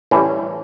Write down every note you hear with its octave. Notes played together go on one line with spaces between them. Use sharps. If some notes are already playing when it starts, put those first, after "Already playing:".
A2 E3 G3 C#4